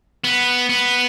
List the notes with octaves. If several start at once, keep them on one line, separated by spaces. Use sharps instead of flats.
B3
B3